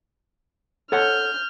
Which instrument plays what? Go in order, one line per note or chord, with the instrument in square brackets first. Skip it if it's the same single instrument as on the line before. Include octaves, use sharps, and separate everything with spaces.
[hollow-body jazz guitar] A4 C#5 F#5 [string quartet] F6 G6